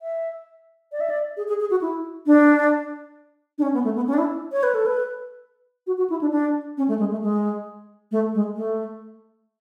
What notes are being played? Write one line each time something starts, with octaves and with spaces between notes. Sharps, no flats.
E5
D5
E5
D5
G#4
G#4
G#4
F#4
E4
D4
D4
C#4
B3
A3
B3
C#4
D4
E4
C#5
B4
A4
B4
F#4
F#4
E4
D4
D4
C#4
A3
G#3
A3
G#3
A3
G#3
A3